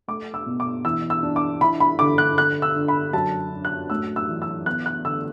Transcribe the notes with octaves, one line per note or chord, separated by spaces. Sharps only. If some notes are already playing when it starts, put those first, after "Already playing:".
A3 D6
E6
B2
D6
E3 E6
E6
D4
D6
E4 B5
B5
D3 D6
F#6
D3 F#6
E6
D3
B5
F#2 A5
D4
F#6
A2 E6
E6
E3
E6
B3 F#6
F#6
D3 E6